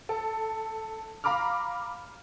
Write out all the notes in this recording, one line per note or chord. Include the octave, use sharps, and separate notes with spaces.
A4
F5 A#5 B5 D6 F6